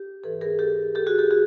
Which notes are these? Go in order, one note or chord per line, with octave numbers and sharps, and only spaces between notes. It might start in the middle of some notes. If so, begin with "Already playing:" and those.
Already playing: G4
G#2 E3 A4 B4
G#4 A#4
G4 A4
G4 A4
F#4 G#4
G4 A4
F#4 G#4